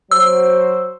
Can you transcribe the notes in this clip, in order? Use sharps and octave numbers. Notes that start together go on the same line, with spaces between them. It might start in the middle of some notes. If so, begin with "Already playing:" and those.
F#3 F#4 C5 E6